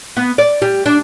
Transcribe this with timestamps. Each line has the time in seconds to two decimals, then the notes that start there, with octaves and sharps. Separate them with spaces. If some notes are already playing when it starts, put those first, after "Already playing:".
0.17 B3
0.38 D5
0.62 G3
0.86 D4